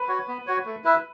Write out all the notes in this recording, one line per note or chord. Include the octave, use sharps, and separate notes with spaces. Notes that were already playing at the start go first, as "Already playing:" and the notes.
Already playing: B4
F#4 C#5
B3
F#4 C#5
A3
E4 B4 E5